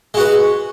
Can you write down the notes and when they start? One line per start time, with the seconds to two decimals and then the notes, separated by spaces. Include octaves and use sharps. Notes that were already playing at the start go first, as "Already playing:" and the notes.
0.14 G#3
0.17 F#4
0.20 B4